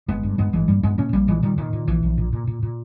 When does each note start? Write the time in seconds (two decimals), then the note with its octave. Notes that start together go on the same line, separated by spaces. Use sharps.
0.08 G1 G#3 B3
0.23 G2
0.38 G2 G#3 B3
0.53 G1 E3 G#3
0.68 G2 G3 A#3
0.83 G2 G#3 B3
0.98 A#2 A#3 C#4
1.13 A#1 G3 A#3
1.27 A#2 E3 G#3
1.43 A#2 D#3 G3
1.58 A#2 D#3
1.73 A#2
1.87 A#1 E3
2.03 A#1
2.18 A#2
2.33 A#2
2.47 A#2
2.63 A#2